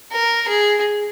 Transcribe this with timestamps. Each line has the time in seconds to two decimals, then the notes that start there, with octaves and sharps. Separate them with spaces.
0.12 A#4
0.48 G#4